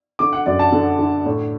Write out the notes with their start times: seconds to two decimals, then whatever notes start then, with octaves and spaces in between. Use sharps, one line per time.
0.19 D3 D6
0.33 F#5
0.46 F#2 D5
0.59 A5
0.72 D3
0.99 D3
1.26 A2